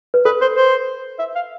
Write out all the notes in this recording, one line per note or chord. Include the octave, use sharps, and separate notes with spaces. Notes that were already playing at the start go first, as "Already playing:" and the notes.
B4
A4 B4
C5
C5
E5
F5